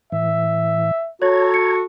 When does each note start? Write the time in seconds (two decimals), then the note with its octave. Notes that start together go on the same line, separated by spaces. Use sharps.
0.12 A2 E3 E5
1.22 F#4 A4 C#5 A#5 G#6
1.54 C#7